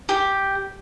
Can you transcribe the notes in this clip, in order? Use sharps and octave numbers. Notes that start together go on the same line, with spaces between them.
G4